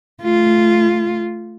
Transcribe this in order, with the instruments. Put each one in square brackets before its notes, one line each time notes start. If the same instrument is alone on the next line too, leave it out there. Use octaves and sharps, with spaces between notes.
[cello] A3 F4